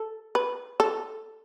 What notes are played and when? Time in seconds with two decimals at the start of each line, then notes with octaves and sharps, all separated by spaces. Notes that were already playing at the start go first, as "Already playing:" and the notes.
Already playing: A4
0.35 B4
0.80 A4